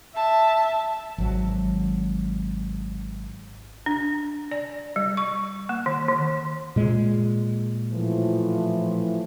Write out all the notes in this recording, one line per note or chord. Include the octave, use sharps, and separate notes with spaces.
E5 A5
G#1 F#3
D4
D5
G3
C#6
A#3
D#3
D#3
A#2 G#3
A2 E3 F3